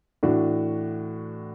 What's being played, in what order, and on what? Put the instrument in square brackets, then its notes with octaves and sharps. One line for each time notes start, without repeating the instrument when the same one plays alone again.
[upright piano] A2 E3 D4 F#4